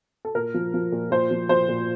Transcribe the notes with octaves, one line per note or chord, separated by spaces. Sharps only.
A4
A#2 A#4
F3
F3
A#2
A#2 C5
F3
F3 C5
A#2